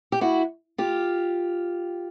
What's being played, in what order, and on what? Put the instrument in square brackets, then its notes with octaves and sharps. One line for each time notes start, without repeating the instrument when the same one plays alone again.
[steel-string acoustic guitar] G4
E4 F#4
F4 G4